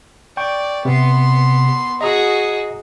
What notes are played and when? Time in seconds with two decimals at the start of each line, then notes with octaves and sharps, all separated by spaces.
0.37 D5 G5 C#6
0.85 C3 B3 C6
2.01 F#4 G#4 D#5 A#5 D#6